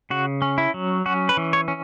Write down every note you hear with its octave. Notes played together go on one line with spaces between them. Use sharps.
C#3 F#4
C#4
E4
F#3
C#4 F#4
B4
E3
C#5
C#4